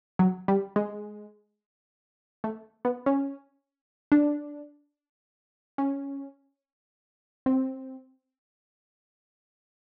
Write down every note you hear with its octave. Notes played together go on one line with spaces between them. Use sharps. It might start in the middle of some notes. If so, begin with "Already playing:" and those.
F#3
G3
G#3
A3
B3
C#4
D4
C#4
C4